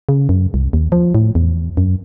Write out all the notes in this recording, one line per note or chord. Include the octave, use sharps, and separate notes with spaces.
C#3
F#2
C2
D#2
F3
A2
E2
F#2